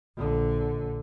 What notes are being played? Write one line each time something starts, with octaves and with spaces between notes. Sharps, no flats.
A#1 D3